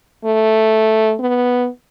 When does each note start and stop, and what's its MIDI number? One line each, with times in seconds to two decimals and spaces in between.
0.25 1.14 57
1.20 1.68 59